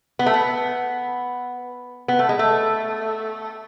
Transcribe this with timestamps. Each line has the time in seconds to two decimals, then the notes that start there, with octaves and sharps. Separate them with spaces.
0.19 B3
0.26 A3
0.33 B3
2.08 B3
2.19 A3
2.29 G#3
2.39 A3